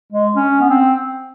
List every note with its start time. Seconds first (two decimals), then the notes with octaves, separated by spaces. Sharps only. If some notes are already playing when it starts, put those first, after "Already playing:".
0.13 G#3
0.36 C#4
0.61 B3
0.70 C4